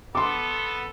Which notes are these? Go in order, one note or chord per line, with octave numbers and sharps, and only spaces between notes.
B3 A4 C6 D6